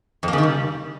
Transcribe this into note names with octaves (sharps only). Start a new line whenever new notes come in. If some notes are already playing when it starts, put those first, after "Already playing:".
F2
A#3
C#3
D#3
G3